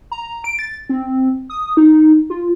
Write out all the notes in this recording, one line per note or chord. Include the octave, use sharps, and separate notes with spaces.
A#5
D7
A6
C4
D#6
D#4
F4